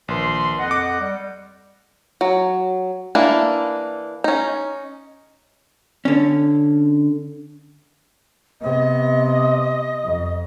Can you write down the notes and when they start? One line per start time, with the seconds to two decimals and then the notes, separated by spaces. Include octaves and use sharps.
0.08 A#1 D#3 B4 C6
0.57 F2 D#5 F#5
0.71 D6
0.98 G3
2.21 F#3
3.15 E3 A#3 D4
4.24 C#4 D#4
6.05 D3 C#4
8.62 C3 B3 D#5
10.04 F2